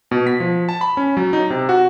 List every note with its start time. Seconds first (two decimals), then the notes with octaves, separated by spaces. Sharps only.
0.11 B2
0.27 B6
0.40 F3
0.69 A5
0.81 B5
0.97 C#4
1.17 F#3
1.33 D#4
1.50 C3
1.69 F#4